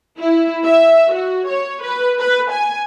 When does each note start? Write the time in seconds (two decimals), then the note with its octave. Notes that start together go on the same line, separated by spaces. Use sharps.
0.19 E4
0.65 E5
1.13 F#4
1.49 C#5
1.83 B4
2.20 B4
2.52 G#5